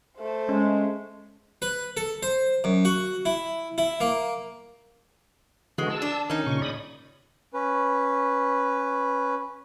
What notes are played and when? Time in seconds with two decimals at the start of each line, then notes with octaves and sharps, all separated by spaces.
0.18 A3 C5
0.49 G#3 C#4
1.62 B4
1.97 A4
2.23 C5
2.64 F#2
2.85 F#4
3.25 E4
3.78 E4
4.01 A#3
5.78 D3 E3 G#3 F#4
5.90 A5 E6
6.02 D4
6.30 D#3 C#4 D#4
6.46 A#2 C#3 C#6
6.62 D5 B5 D#6
7.54 C#4 B4